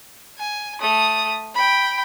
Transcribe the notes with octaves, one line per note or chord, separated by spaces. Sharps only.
G#5
A3 D#6
G5 B5